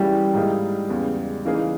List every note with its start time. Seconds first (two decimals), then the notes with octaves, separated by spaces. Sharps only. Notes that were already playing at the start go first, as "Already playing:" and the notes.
Already playing: E3 G3 A#3 C#4 E4 G#4
0.34 G#2 D#3 A#3 E4 G#4
0.89 E2 C#3 G#3
1.45 C#3 E3 A#3 D#4 G#4